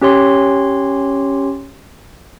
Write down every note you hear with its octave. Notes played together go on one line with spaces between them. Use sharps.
C#4 G4 C#5 C6